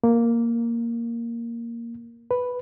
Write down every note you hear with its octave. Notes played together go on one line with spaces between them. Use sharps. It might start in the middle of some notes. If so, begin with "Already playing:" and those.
A#3
B4